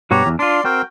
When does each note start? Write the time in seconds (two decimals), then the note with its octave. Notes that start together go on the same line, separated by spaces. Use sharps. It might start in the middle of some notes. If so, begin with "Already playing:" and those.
0.11 G2 B2 F#4 G4 C#5 A#5
0.26 E2
0.39 D4 F4 D5 C6
0.64 C4 F#4 A#4 G5